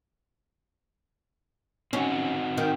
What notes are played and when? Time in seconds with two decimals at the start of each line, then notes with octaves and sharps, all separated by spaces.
1.93 C4 C#4 D#4 F#4
2.58 D#3